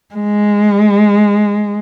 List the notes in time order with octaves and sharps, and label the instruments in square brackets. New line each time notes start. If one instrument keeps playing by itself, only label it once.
[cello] G#3